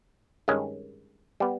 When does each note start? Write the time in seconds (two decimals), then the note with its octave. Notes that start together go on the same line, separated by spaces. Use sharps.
0.48 G2 D#3 G#3 C#4
1.40 G3 B3